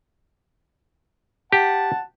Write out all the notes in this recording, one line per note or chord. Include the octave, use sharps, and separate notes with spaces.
G4 F#5 A5